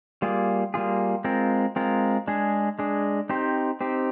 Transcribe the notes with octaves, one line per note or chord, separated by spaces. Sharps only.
G3 A#3 F4 G#4
G3 A#3 F4 G#4
G#3 C4 F4 A#4
G#3 C4 F4 A#4
G#3 D4 G#4
G#3 D4 G#4
C4 D#4 G4 C5
C4 D#4 G4 C5